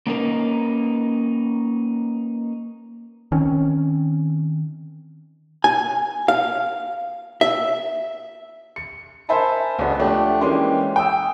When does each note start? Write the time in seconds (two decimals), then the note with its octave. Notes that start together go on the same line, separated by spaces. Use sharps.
0.07 A#3 C#4 D#4 F4 A#4 B4
3.32 D#3 C4 C#4
5.64 G#5
6.28 F5
7.41 E5
8.76 C#7
9.29 A#4 C5 E5 G#5 A5 B5
9.79 C#2 B3 D4 F#4 A4 D#5
9.99 F3 A3 D4 G4
10.41 E3 G#3 A#3 C#4 G4 C6
10.96 G5 D#6 E6